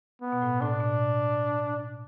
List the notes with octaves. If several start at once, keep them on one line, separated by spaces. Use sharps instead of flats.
B3
B2
A2
A2 D4
B2